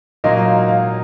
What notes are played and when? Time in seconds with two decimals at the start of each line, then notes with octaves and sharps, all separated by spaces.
0.24 A#2 F#3 A#3 D#4 D#5
0.46 F5
0.68 F5